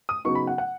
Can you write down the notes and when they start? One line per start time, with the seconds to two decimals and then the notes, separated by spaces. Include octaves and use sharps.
0.09 D#6
0.25 C#3 F#3 B3 D#4 C#6
0.35 B5
0.47 F#5
0.58 F#5